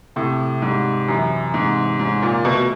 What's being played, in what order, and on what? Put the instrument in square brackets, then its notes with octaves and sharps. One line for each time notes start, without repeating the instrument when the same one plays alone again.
[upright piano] A2 [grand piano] C3
[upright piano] G#2 [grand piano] G3
[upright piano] F#2 [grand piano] E3
[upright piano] G#2 [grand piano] C3
[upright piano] G#2 [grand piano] C#4
[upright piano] A#2
[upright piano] B2 [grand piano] A3